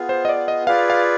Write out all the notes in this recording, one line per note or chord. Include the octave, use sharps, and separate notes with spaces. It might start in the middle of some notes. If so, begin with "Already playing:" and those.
Already playing: B3 F4 G#4
C5
D#5
D5
D#5
F4 G#4 B4 D5 F5
F5